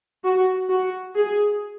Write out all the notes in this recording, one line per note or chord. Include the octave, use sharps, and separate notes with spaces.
F#4
F#4
G#4